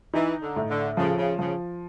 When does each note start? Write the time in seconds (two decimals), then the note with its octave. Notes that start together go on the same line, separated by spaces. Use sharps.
0.14 E3 D#4
0.41 D3
0.56 A2
0.69 D3
0.97 C#3 F3
1.18 C#3
1.39 C#3 F3